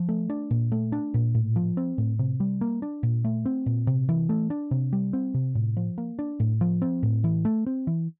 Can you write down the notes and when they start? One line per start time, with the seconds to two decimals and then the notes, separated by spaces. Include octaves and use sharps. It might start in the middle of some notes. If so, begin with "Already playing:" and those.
Already playing: F3
0.09 A3
0.30 D4
0.51 A#2
0.72 A3
0.92 D4
1.14 A#2
1.35 A2
1.56 F3
1.77 C4
1.98 A2
2.19 C3
2.40 G3
2.61 A#3
2.82 D4
3.03 A#2
3.24 A3
3.46 C4
3.66 A#2
3.87 C3
4.09 E3
4.29 A3
4.50 D4
4.71 C3
4.93 G3
5.13 C4
5.34 C3
5.55 A2
5.77 F3
5.98 A#3
6.19 D4
6.40 A2
6.61 F3
6.82 C4
7.03 A2
7.24 E3
7.45 A3
7.66 C4
7.87 E3